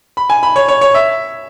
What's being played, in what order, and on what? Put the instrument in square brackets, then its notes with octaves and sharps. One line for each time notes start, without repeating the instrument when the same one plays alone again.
[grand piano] B5
G#5
B5
C#5
C#5
C#5
E5